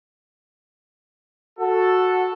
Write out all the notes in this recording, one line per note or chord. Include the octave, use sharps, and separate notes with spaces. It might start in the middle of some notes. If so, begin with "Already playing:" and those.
F#4 A4